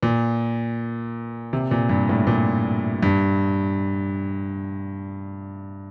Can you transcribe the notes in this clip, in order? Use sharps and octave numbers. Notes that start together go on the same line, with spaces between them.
A#2
C3
A#2
G2
A2
A#2
G2